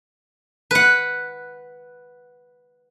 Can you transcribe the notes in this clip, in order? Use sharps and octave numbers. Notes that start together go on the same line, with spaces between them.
B4 F#5